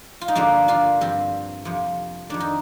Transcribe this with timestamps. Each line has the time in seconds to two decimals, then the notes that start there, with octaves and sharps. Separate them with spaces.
0.21 F4
0.28 D#4
0.35 G2 D3 F3 A#3 D4
0.68 D4 F4
1.01 G2 F3 C4
1.65 F2 C3 F3
2.30 F2 D#3 D4
2.40 D#4